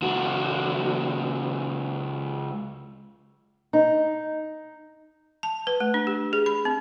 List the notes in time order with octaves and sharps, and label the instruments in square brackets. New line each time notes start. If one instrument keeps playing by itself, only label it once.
[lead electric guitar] C#2 F#4
[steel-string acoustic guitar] D#4
[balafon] A5
B4
A3
D4
G4
G#4
B5
C4